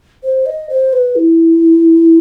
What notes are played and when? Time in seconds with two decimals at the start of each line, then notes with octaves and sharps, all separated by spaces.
0.23 C5
0.46 D#5
0.70 C5
0.93 B4
1.16 E4